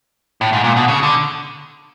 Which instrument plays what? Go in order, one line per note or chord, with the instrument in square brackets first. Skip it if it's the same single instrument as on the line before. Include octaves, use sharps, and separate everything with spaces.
[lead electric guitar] A2
G#2
A#2
B2
C#3
D3